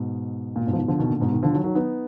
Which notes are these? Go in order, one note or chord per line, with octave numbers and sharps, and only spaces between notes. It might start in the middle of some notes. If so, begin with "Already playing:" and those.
Already playing: G#2 B2
A#2
G#2 B2
F3
B2 D#3
D3 F3
B2 D#3
A#2 D3
G#2 B2
B2 D#3
D3 F3
D#3 F#3
D#3 F#3
B3 D#4